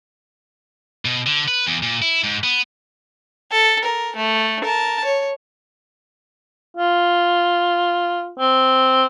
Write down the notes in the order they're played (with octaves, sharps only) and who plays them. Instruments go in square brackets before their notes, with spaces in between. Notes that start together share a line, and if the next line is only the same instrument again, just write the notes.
[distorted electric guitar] B2
D3
B4
E2
A#2
E4
G#2
B3
[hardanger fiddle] A4
A#4
A3
A#4 A5
C#5
[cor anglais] F4
C4